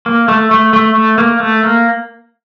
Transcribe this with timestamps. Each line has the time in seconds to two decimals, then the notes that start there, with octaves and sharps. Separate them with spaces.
0.06 A#3
0.28 A3
0.51 A3
0.73 A3
0.95 A3
1.18 A#3
1.40 A3
1.63 A#3